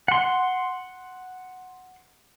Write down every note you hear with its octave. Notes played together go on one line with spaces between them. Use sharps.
F#5 C6